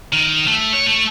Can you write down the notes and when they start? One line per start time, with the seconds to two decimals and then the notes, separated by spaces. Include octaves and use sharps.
0.13 D#3
0.47 A3
0.73 C#5
0.86 A3